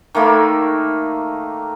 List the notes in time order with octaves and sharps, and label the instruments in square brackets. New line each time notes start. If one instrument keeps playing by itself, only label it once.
[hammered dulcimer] D#3 A3 A#3 B5